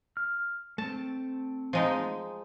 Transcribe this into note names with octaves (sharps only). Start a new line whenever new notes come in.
F6
A3 C4 A5
F3 G#3 D#4